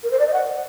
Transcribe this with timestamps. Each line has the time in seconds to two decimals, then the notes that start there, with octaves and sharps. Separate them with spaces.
0.03 A#4
0.11 C5
0.19 D5
0.27 D#5
0.33 F#5